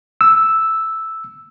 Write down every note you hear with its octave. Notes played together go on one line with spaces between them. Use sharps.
E6